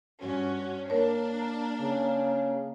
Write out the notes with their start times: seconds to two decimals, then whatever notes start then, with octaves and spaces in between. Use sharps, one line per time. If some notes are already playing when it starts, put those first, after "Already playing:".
0.21 G2 C#4 F#4
0.90 A#3 D4 A#4 C#5
1.81 C#3